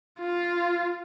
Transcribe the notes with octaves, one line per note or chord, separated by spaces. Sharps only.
F4